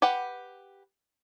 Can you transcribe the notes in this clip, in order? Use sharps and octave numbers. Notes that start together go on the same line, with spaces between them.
G4 B4 F#5